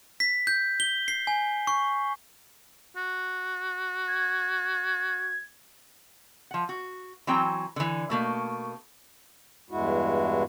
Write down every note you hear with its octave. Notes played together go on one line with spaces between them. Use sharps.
B6
G6
G7
C7
G#5
C#6
F#4
G#6
F3 F#5
F#4
E3 F#3 C4 G5 A#5
D3 E3
B2 A3 A#3
E2 G2 G#3 E4 F#4